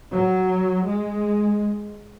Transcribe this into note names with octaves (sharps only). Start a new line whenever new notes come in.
F#3
G#3